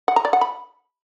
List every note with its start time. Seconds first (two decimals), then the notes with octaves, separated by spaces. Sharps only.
0.08 F#5
0.16 A#5
0.25 D5
0.33 F#5
0.41 B5